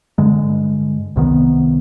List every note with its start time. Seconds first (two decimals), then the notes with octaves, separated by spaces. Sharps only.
0.18 G2 D3 G#3
1.16 C2 C3 D#3 B3